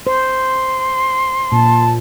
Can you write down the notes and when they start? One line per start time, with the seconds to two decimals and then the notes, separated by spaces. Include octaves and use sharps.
0.07 C5 C6
1.52 A#2 A5